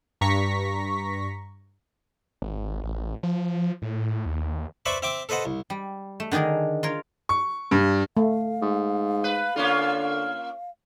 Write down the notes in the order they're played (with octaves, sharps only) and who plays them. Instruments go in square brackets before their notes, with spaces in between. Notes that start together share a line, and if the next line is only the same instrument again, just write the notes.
[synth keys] G2 A#5 C#6 A#6 B6
[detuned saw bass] G#1
A1
F3
A2
D#2
[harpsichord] B4 C5 D5 E5 B5 C#6
C4 E5 G5 D6
A4 B4 C5 D#5 F#5
C2
[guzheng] G3
A3
D3 D#3 D4 G#4 A#4
F4 A#4 C#5
[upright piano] C#6
G2
[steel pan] A3 [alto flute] F5
[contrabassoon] G#2
[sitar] B4
[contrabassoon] D3 [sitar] A#3 C#4 F4